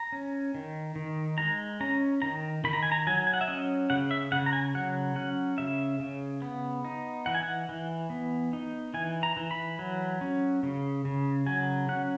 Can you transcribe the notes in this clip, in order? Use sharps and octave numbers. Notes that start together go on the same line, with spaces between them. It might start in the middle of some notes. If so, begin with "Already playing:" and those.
Already playing: A#5
C#4
D#3
D#3
G#3 A#5
C#4 A#5
D#3 A#5
D#3 B5
A#5
G#5
A#5
F#3 G#5
G#5
F#5
E5
C#4 D#5
C#3 F#5
E5
C#3 F#5
A#5
G#5
F#3 F#5
C#4 F#5
C#3 E5
C#3
B3
D#4
E3 F#5
G#5
F#5
E3
B3
D#4
E3 G#5
A#5
E3
B5
F#3
C#4
C#3
C#3
F#3 G#5
C#4 F#5